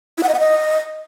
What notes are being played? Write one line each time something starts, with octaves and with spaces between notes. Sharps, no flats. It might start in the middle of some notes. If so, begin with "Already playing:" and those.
E4
F#5
D#5
F#5
D#5